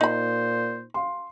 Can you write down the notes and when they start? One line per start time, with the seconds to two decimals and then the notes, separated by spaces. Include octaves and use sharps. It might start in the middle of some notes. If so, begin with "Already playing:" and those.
0.01 A#2 D#4 C5 B5
0.94 F5 C6